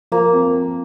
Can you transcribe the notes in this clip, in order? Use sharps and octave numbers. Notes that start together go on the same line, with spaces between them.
F3 A#3
C4